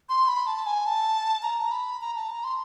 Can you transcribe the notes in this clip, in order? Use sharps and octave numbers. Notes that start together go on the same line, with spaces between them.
C6
B5
A5
G#5
A5
A#5
B5
A#5
A5
A#5
C6